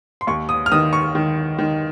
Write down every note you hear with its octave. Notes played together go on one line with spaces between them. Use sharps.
C6
D#2 C#6
D#6
F6
D#3 D#6
C#6
D#3
D#3